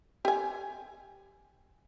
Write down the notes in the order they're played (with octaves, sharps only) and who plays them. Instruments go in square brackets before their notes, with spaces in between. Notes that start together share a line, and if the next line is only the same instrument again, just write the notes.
[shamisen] G4 G#5